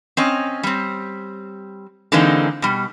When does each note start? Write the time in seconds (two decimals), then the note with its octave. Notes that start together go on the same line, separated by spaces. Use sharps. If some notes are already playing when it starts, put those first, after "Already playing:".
0.17 C4 C#4 D#5
0.63 G3 C4
2.12 D3 E3 G#3 A#3 C4 D#4
2.62 B2 G3